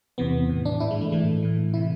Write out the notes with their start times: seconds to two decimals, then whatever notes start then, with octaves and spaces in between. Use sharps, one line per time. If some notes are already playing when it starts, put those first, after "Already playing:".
0.18 E2 C3 E3 B3
0.49 A2 E3
0.65 D4
0.80 G#2 E3 E4
0.91 G#3
1.01 A3
1.12 A2 E3 A3
1.43 A2 E3
1.74 C3 E3 E4